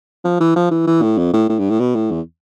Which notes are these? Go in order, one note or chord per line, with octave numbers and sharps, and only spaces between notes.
F3
E3
F3
E3
E3
A2
F2
A2
A2
G2
A2
B2
A2
E2